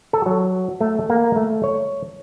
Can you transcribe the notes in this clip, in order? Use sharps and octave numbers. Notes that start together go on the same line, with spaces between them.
A4
F#3
A3
A#3
A3
C#5